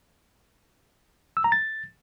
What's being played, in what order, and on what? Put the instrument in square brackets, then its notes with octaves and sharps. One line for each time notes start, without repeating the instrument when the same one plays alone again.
[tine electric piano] E6
A#5
A6